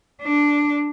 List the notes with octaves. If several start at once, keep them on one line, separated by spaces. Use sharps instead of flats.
D4